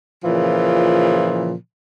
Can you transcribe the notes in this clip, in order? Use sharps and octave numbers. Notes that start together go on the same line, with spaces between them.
A#2 C#3 E3 F3